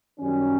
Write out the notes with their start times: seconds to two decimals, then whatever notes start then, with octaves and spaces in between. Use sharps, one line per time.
0.20 F#2 D#3 G3 C#4